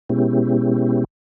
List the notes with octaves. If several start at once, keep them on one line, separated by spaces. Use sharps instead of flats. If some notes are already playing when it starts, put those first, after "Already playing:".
B2 G#3 B3 C#4 E4 G4